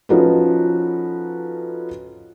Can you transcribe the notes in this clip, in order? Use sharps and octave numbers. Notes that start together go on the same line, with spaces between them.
F3 C#4 D#4 F#4 A4 B4